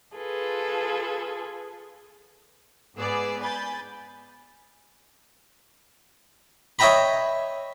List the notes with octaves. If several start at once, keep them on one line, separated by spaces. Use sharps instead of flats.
F4 G#4 A4 B4
G#2 B3 G#4 B4 D5 E6
G#5 B5 G6 A6
C#5 D#5 E5 G5 A#5 B5